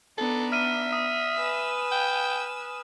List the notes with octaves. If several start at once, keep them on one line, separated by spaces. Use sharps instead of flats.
B3 D4 D#4 A4
E5 F6 D#7
D#6
B4 G#5 E6
G5